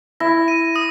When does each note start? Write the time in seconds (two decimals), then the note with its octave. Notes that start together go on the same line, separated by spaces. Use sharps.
0.20 E4 A#6
0.48 D#7
0.76 D#6